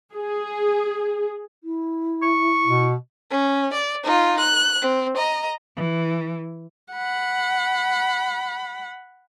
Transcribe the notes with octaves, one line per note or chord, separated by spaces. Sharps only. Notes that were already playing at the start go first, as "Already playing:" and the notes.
G#4
E4
C#6
B2
C#4
D5
D#4 F4
F#6
C4
D#5 A#5
E3
F#5 B5